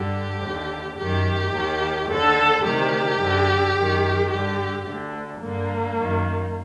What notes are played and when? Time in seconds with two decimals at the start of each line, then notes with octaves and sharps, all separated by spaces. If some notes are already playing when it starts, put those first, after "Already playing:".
Already playing: G2 D3 G4
0.42 D#2 D3
0.97 F#2 D#3 G4
1.53 D#2 D#3
2.08 D#2 D3 A4
2.63 D2 C3 D#3 G4
3.19 F#2 D3
3.74 F#2 D#3
4.29 G2 D3 G4
4.85 D2 D3
5.40 G2 D3 A#3
5.96 F#2 D#3